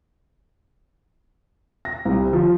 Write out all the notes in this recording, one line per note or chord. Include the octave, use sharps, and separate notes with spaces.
A#6
C2
F3